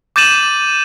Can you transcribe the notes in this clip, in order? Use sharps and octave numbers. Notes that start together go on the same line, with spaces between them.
D6 G6 A6 D#7 E7 F#7